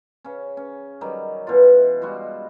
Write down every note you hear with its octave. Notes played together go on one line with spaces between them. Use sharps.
C#3 C#4
C#4
D#3 F#3 G3
B2 E3 F4
G3 G#3 F4 F#4